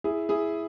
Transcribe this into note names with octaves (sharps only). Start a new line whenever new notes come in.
E4 G#4
E4 G#4